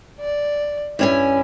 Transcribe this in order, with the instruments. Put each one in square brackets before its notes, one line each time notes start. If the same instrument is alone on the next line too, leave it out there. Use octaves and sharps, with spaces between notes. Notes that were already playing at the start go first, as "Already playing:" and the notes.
[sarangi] D5
[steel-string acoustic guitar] G2 C#4 G#5 [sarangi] E4